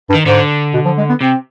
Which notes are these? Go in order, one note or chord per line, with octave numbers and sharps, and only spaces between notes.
G2
D#3
G#2 D3
B2
F3
G#3
B3
C3 C4